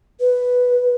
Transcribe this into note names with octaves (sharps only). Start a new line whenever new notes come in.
B4